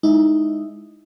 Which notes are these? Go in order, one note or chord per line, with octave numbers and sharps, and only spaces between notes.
G#3 D#4 E4